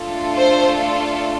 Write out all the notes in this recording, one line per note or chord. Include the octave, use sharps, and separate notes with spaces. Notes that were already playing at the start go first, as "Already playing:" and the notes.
Already playing: A3 D4 F4 A4
C5